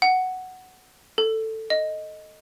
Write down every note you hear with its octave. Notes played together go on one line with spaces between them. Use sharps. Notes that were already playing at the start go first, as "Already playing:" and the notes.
F#5
A4
D#5